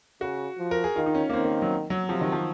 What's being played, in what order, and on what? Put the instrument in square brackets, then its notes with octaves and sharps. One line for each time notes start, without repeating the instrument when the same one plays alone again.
[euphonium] C#3 [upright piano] F#4
[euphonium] F3
[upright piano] A#4
G#4
[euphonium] D#3 [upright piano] F4
[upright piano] D#4
C#4
A#3
[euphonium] D#3 [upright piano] C4
[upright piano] A#3
F#3
F#3
[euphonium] C3 [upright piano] F3
[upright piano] D#3
F3